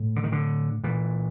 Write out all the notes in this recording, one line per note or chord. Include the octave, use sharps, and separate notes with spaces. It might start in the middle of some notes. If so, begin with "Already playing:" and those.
Already playing: A2
D3
D#3
D3
A#2 E3